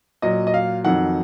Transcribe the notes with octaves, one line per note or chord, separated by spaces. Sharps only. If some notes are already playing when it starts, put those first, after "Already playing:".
A#2 F#3 D#5
D#5
F5
F2 D#3 F#3 F#5